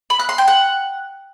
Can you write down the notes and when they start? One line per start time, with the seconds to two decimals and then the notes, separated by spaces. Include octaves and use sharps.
0.10 B5
0.20 F#6
0.29 C6
0.38 G5
0.48 F#5